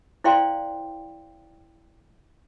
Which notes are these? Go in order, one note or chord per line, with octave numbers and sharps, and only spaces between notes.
E4 C5 D5 F5 G5 C6